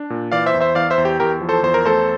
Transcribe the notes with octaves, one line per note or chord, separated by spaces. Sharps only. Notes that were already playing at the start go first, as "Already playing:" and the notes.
Already playing: D4
A#2
E3 D5 F5
C5 E5
E2
C5 E5
E2 D5 F5
C5 E5
E2
G4
E2 G4 A#4
F3
A4 C5
E2 C5
A#4
A3 A4 C5